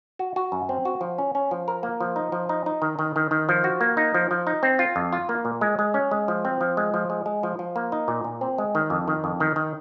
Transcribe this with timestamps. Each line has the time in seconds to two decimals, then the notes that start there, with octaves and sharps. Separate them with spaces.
0.19 F#4
0.36 F#4
0.52 F#2
0.69 C4
0.85 F#4
1.01 F3
1.18 C#4
1.35 C#4
1.51 F3
1.68 A#4
1.83 A#3
2.00 F3
2.16 D#4
2.32 F3
2.49 D#4
2.66 D#4
2.82 D#3
2.99 D#3
3.16 D#3
3.31 D#3
3.49 F3
3.64 F#4
3.81 A#3
3.97 D#4
4.14 F3
4.31 F3
4.47 D#4
4.63 C4
4.79 F4
4.96 F2
5.12 F4
5.29 A#3
5.45 A#2
5.61 G#3
5.79 G#3
5.94 C#4
6.11 G#3
6.28 F3
6.45 C4
6.61 F3
6.77 G#3
6.94 F3
7.10 G#3
7.26 G#3
7.43 F3
7.59 F3
7.76 A#3
7.92 D#4
8.08 A#2
8.24 A#2
8.41 C4
8.58 G#3
8.75 D#3
8.90 F2
9.08 D#3
9.24 F2
9.40 D#3
9.56 D#3